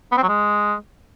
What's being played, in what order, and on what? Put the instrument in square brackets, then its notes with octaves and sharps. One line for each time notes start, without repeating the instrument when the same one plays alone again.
[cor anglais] B3
C4
F#3
G#3